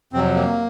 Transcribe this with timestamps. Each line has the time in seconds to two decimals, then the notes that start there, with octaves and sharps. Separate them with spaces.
0.13 F2 C3 F#3 C4
0.35 A#3